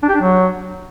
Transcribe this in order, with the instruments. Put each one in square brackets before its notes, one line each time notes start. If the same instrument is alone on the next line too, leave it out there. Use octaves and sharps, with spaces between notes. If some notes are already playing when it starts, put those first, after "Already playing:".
[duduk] D4
G4
D4
F#3